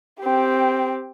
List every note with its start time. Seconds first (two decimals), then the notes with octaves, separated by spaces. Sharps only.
0.21 C4 G4